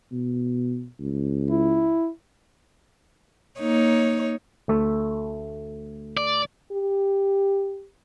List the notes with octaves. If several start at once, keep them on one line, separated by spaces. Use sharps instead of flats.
B2
C#2
E4
A#3 D#4 C#5
D2 A3 E5
D5
G4